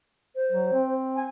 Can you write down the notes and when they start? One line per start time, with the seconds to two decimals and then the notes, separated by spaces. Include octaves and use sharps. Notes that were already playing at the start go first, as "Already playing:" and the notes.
0.35 C5
0.52 F#3
0.73 C4
1.16 G#5